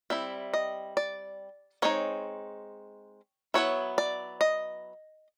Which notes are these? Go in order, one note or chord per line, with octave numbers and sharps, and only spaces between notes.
G3 C4 E4 E5
D#5
D5
G#3 C4 D#4 C#5
F#3 B3 E4 C#5
D5
D#5